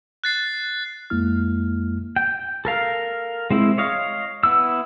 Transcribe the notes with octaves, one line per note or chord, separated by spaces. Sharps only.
F#6 A6 C7
F2 G#3 A#3 E4 F6
G5
A4 A#4 F5
G#3 C4 E4
C#5 D#5 F5
B3 E4 E6